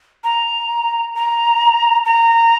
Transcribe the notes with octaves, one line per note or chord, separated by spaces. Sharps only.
A#5
A#5
A#5